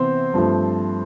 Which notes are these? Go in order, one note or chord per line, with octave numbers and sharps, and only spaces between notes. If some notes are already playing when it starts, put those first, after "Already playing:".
Already playing: C3 E3 B3 C4 C5
G2 F3 A3